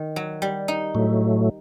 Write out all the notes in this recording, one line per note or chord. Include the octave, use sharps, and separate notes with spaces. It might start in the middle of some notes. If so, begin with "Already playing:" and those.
Already playing: D#3
F#3
G3
D#4
A2 F#3 A3